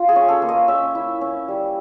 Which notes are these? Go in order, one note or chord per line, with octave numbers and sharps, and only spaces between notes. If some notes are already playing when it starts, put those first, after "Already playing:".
Already playing: F4
G#4
C#4
A4
A#3
D#5
C#4 E5
E4
C#4
G3